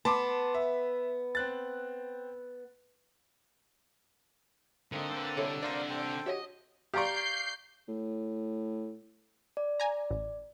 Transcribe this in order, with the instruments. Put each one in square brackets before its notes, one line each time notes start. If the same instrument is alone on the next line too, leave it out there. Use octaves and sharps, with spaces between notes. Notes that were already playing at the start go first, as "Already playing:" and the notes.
[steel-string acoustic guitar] B3 [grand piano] A5 C6 D6
[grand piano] E5
C4 F#6 A6
[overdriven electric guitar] G#2 D#5 [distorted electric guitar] D3 [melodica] A#3 C4
[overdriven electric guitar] B4 C5
[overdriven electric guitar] C3 G3 [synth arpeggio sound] E4 A4 C#5
[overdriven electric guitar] C3 D4 [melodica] A#4 C5 F5 [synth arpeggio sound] D5 A#6
[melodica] A4 C5 G5
[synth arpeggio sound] F#4 G4 C#5 [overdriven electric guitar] D#5 E5
[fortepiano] G4 D5 [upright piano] F5 A#5 C#6 [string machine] G6 C7
[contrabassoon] A2
[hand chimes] D5
[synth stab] G#5 A#5
A1